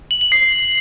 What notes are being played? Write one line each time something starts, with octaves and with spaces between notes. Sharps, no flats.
F#7
F#7
C7